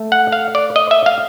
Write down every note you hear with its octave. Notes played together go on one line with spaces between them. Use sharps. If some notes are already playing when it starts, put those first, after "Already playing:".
Already playing: A3
F#5
F5
D5
D#5
E5
F5